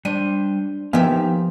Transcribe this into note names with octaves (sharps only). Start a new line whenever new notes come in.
G3 D4 C5 D#7
F3 A#3 B3 D#4 G4 E5 F5 G#5